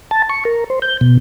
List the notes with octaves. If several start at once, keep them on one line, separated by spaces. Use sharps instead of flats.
A5
C#6
A#4
C5
G6
B2